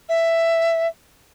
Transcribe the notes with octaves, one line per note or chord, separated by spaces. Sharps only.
E5